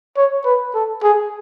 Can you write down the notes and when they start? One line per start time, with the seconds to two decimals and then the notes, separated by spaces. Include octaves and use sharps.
0.17 C#5
0.45 B4
0.74 A4
1.03 G#4